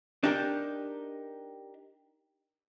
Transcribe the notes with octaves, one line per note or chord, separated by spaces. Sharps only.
D4 D#4 G4 A#4